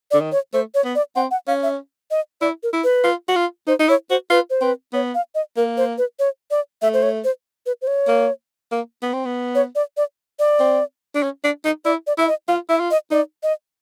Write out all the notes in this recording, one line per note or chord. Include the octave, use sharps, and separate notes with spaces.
D5
D3
D#3
C#5
A3 C5
C#5
B3
D5
C4 F#5
F#5
C#4 F5
E5
D#5
E4 D5
A#4
E4
B4
F4
F#4
F4
D#4 C5
D#4
E4 C#5
F#4 C5
F4 B4
C5
C4 B4
B3 C#5
F5
D#5
A#3 A#4
C5
B4
C#5
D5
A3 E5
C5
C#5
C5
B4
C5
C#5
A#3
A#3
B3
C4
B3
C#5
D5
D5
D5
C4
D4
C#4
D4
D#4
E4 D5
D5
E4 E5
D#5
F4 F5
E4 E5
F4
D#5
D#4 D5
D#5